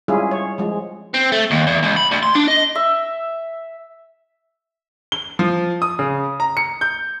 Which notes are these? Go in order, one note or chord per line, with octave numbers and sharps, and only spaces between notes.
G3 G#3 C#4 E4 F4 G#4
C#5
F3 G#3
C4
A3
D#2
E2
C#2
B5
D2
C6
D4
D#5
E5
G7
F3
D#6
C#3
A#5
C#7
G6